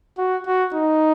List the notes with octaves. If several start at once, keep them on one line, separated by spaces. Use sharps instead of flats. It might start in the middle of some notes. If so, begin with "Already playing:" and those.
F#4
F#4
D#4